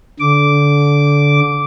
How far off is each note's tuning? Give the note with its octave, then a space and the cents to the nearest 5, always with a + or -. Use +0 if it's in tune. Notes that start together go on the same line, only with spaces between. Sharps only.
D3 -20 D6 -10